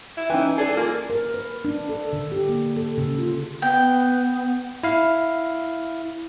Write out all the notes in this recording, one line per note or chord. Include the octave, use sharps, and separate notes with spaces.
E4
E3 C#4 D#4 G5 G#5
G#4 A4 D5 G#5
A#3 F4
A#4
B4
D4
A4
D3
G4
A#3
A4
C#3
F4
B3 G5
E4 F5